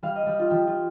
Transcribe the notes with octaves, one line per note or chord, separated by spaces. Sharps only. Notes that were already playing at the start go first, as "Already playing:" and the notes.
G3 F5
D#5
G3 G4
F4
F3 G4
F4